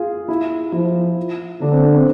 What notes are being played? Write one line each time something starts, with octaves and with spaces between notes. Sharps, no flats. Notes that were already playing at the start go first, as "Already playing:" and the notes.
Already playing: F4 G#4
E4
F3 E4
D3 D4
C4
D4
C4